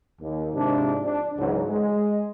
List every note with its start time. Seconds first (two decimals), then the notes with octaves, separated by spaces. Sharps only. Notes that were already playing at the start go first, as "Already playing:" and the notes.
0.21 D#2
0.54 G#2 C3 F3 D4
1.04 D4
1.38 C#2 G#2 E3 F#3 G#3
1.69 G#3